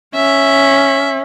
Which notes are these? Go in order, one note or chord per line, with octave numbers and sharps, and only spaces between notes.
C#4 E5